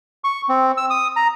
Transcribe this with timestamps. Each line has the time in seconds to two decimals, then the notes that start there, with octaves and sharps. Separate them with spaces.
0.24 C#6
0.49 C4
0.77 E6
0.90 D#6
1.16 A#5